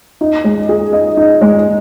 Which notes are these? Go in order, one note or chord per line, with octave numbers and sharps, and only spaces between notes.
D#4
G#3
G#4
D#5
D#4
G#3